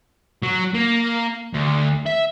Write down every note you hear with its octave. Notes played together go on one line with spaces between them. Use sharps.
F#3
A#3
D2
E5